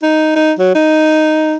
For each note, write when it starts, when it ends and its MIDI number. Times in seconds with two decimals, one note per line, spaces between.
0.03 0.36 63
0.36 0.52 63
0.59 0.75 54
0.75 1.57 63